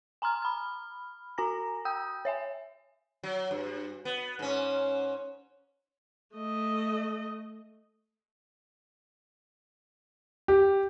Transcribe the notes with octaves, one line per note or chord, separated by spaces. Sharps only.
G#5 A#5 C6 F6
B5 F6
F#4 G#5 A#5 A#6
G5 D#6 E6 G6
C#5 E5 G#5
F#3
G2
B3
G#2 C#4
A3 D#5
G4